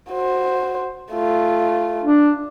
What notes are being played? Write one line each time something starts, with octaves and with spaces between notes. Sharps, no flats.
F#4 C5
A3 F4
D4